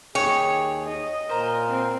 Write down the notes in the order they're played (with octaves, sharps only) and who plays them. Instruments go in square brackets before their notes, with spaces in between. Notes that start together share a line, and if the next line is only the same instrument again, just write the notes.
[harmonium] D#2 G#4 [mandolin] G4 [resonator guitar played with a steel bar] C#5
[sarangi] D#5
[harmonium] A#2 A#4 [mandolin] C5 A#5
[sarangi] C4